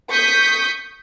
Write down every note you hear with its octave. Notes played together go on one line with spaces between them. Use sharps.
C#6 D#6 G6 B6